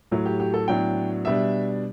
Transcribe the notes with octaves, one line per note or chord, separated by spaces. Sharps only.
A2 F#3 A3
G4
G4
A4
A2 F#3 B3 D4 G5
B2 G3 D4 E5